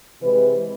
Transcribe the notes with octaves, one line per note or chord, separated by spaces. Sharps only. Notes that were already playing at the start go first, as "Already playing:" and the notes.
C3 E3 G#3 B4